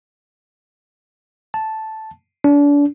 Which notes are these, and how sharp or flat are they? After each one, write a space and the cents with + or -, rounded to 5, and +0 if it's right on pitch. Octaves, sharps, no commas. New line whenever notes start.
A5 -5
D4 -35